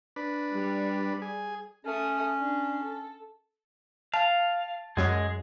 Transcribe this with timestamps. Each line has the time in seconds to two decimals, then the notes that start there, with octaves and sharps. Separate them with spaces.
0.16 D4 B4
0.53 G3
1.22 G#4
1.85 A3 C#4 D#6
2.38 D4
2.84 A4
4.14 F5 A5
4.97 F#2 F#3 G#3 G#4